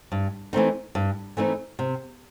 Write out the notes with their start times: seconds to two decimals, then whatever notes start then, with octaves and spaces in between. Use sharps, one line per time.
0.12 G2
0.53 E3 A3 C4 D#4
0.95 G2
1.37 E3 A3 C4 D#4
1.79 C3